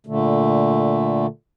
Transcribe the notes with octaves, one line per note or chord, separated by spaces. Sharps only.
A#2 D3 A3